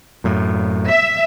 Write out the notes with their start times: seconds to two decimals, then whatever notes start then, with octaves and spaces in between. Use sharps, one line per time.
0.24 F#2 A2
0.88 E5